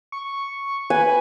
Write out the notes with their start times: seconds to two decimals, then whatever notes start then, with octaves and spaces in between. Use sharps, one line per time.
0.12 C#6
0.90 B4 G#5